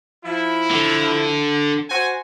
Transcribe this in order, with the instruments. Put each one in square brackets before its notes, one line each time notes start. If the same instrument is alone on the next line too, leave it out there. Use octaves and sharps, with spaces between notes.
[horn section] F3 E4
[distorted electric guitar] D3
[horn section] F#4 C5 G#5